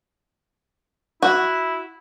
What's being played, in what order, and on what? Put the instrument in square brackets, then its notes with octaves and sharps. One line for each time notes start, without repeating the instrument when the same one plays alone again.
[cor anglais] E4 [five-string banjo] F#4